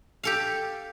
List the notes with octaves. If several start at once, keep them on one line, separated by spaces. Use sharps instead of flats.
G4 A4 F5